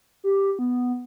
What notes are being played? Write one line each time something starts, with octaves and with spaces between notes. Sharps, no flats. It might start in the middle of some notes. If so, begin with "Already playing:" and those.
G4
B3